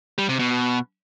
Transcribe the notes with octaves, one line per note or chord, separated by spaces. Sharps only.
G3
C3
B2